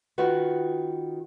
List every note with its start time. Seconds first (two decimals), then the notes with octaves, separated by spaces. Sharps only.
0.18 D#3 F4 F#4 B4